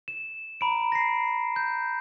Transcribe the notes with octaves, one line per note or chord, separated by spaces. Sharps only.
E7
A#5 B5 D7
A#6 C7
G6